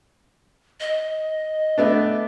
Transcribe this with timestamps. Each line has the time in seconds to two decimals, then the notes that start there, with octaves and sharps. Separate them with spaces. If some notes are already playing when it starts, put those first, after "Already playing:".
0.80 D#5
1.78 A3 B3 D4